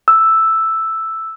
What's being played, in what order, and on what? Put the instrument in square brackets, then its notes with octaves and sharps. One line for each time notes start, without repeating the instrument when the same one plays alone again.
[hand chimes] E6